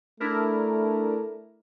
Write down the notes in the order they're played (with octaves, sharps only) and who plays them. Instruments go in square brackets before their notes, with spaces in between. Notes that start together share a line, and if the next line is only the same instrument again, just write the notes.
[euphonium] A3 [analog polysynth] D4 E4 A#4